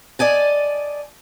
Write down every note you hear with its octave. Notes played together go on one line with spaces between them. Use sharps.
D5 D#5 G#5 A5